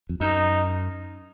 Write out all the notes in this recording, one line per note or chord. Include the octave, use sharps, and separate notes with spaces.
F2
F#2 D#4